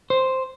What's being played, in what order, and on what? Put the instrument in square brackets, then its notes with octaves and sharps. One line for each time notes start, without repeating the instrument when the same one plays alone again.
[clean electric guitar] C5